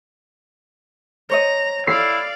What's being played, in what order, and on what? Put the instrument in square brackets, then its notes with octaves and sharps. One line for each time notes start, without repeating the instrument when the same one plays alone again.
[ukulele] C5 C#5 D#5 [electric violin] A#5
[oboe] E4 [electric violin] D5 F5 [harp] C7